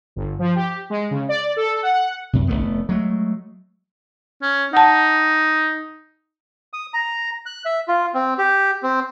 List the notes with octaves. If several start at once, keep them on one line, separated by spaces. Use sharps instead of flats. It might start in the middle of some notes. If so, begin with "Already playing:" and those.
G1
F3
G4
G#3
C#3
D5
A4
F#5
F#2 C3
F1 E2 A3 B3
F#3 G#3 A3
C#4
D#4 F#5 A5
D#6
A#5
F#6
E5
F4
C4
G4
C4